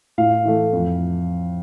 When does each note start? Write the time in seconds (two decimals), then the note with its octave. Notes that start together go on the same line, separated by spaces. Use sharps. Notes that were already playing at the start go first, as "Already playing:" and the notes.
0.18 A2 F5
0.45 E3 A3
0.73 F2